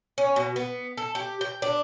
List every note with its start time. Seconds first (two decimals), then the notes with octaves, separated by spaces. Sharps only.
0.18 C#4
0.36 B2
0.56 B3
0.97 A4
1.15 G4
1.41 G5
1.62 D4